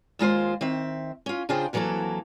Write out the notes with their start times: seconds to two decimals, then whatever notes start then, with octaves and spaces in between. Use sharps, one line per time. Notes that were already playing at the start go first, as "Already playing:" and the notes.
0.19 D#2 G#3 F4 C5
0.61 D#3 C4 E5
1.26 C#4 F4
1.49 C#3 D4 F4 G#4 C5 G5
1.73 F2 E3 F#3 G#3 A#3 A4